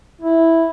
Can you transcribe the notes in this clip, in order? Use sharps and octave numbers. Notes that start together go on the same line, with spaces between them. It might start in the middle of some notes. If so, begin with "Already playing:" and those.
E4